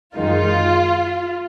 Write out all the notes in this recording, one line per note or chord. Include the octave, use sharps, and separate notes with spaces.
F#2 D#3 G#3 D#4 F4